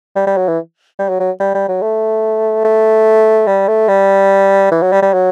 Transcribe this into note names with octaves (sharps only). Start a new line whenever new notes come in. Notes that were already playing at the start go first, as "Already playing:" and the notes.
G3
G3
F#3
E3
G3
F#3
F#3
G3
G3
F#3
A3
A3
G3
A3
G3
E3
F#3
G3
G3
F#3